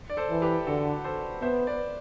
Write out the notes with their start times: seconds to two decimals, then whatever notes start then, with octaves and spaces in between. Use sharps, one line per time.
0.10 D5
0.17 A4 C5
0.30 E3
0.42 G4 B4
0.67 D3 F#4 A4
1.04 A4 C5
1.42 B3 C5 E5
1.67 B4 D5